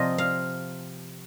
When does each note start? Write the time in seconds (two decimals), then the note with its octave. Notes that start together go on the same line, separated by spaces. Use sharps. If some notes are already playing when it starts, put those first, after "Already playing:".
Already playing: C3 F3 C4 D#5
0.18 F5